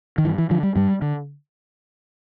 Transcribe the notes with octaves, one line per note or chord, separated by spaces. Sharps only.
D#3
G2 E3
E3
D3 F3
G3
G2 G3
D3